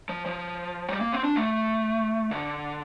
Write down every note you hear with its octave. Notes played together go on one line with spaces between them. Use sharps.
F3
F3
G3
A#3
C4
D4
A3
D3